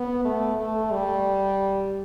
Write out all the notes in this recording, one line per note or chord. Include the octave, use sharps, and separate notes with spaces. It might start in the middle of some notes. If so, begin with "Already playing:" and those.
Already playing: B3
A3
A3
G3